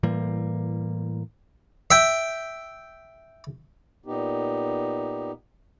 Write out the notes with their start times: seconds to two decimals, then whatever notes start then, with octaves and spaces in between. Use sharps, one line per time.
0.03 A2 E3 G3 A#3
1.91 E5 G5
4.06 A#2 B3 D#4 G4